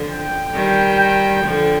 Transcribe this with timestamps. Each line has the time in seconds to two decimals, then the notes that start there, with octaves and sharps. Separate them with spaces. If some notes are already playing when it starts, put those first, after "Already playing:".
Already playing: D3 F3
0.09 G5
0.54 D#3 G3
0.99 G5
1.45 D3 F3 G5